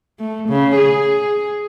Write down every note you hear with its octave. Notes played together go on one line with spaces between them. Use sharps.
A3
C#3
G#4